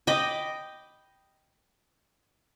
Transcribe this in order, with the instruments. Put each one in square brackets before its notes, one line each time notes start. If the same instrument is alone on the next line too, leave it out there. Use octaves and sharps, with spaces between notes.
[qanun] D#5 G5 B5 D6